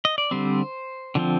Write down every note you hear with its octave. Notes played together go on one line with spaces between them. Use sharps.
D#5
D5
D3 G3 C4 C5
D3 F3 C4